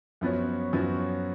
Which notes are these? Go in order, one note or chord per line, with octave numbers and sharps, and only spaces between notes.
F#2 F3 B3 F#4 C#5
F#2 F3 B3 F#4 C#5